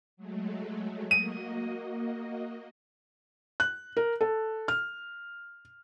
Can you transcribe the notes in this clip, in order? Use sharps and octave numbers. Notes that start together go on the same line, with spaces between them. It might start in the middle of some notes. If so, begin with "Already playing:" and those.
F#3 G#3 A3
A#3 F#4 D#5 D#7
F#6
A#4
A4
F6